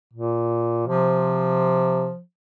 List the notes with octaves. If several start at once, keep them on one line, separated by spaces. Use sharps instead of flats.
A#2
C3 F3